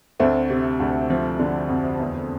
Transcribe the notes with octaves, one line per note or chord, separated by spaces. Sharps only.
D2 A3 C4
C3
D2
F3
D3
F2
E2